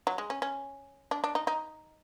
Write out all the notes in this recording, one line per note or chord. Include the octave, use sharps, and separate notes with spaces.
F#3
G#3
C#4
C#4
D4
D4
D#4
D#4